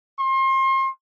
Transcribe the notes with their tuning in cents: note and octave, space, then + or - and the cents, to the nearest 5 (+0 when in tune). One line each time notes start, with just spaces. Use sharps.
C6 +35